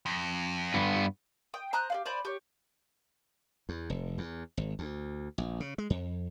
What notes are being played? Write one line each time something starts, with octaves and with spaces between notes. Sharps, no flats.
F2
G2 B3
G5 D#6
C5 A#5 D#6 F#6
G4 D5 F5
C5 D5 G#5 B5
G4 C#5
E2
F1
E2
G#1
D2
A#1
C#3
G#3
F2